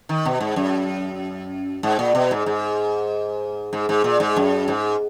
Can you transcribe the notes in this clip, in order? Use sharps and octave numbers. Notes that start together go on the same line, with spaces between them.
D#3
B2
G#2
F#2
G#2
A#2
B2
G#2
G#2
G#2
G#2
A#2
G#2
F#2
G#2